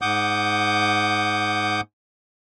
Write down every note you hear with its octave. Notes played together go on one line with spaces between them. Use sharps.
G#2 F#5 D6 D#6 G6